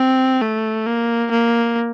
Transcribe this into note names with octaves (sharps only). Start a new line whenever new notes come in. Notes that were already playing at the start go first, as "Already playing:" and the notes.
Already playing: C4
A3
A#3
A#3